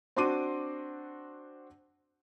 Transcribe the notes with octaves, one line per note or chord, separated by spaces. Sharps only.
C4 D4 F#4 C6 D6 D#7